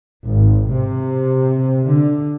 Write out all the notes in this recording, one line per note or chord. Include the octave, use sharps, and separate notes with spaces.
G#1
C3
D3